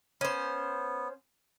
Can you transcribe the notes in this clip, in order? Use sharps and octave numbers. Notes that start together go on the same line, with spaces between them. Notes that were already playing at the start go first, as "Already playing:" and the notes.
B3 C#4 C5